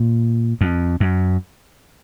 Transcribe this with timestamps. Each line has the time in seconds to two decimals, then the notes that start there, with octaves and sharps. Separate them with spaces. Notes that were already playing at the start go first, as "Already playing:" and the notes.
Already playing: A#2
0.61 F2
1.00 F#2